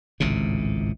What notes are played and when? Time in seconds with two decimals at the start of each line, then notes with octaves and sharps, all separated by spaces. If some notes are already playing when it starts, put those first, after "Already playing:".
0.20 G#1 C#2 A2 C3